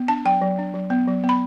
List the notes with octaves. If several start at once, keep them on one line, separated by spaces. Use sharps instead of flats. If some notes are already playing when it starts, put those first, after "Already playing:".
Already playing: B3
D4 A5
F#3 G5
F#3
D4
F#3
B3
F#3
B3
B5